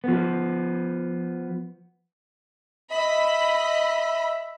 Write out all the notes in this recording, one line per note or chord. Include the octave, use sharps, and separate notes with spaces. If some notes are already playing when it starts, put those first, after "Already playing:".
F3 B3
D#5 E5 B5